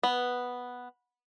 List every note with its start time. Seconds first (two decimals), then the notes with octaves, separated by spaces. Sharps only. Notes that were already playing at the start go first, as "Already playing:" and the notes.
0.03 B3